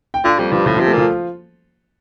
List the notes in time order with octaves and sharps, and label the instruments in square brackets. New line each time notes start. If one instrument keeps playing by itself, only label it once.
[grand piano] G5
[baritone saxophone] D3 [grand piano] F4 F5
[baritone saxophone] F2 [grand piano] G3 G4
[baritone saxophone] G2 [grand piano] F3 F4
[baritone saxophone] A2 [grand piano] F3 F4
[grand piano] F3 F4
[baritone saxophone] C3
[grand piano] A3 A4
[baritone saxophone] A#2 [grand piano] F3 F4